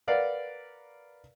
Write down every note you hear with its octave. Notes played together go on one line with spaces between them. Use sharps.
A#4 B4 D5 F5 F#5